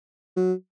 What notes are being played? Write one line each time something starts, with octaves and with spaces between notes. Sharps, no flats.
F#3